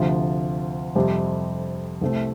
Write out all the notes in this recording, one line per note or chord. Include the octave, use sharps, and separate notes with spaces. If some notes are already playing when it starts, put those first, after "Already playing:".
Already playing: D2 C3 F3
F2 C3 G3 C4
C2 C3 A3 C4